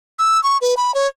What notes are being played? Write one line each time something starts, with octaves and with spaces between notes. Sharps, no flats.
E6
C#6
B4
B5
C#5